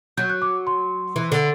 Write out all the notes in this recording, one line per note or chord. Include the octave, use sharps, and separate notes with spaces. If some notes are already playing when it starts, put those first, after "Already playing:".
F#3 G6
F#6
D6
C6
E3
D3